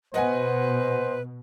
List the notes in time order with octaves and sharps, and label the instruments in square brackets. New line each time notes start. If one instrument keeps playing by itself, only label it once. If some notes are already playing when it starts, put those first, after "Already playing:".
[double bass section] B2 [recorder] B4 [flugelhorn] C5 [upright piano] D#5 F#5 G#5